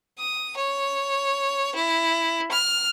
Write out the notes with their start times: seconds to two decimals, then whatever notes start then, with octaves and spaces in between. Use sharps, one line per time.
0.19 D#6
0.57 C#5
1.75 E4
2.52 F6